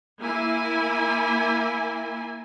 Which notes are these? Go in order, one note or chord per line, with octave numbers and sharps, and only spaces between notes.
A#3 E4 G#5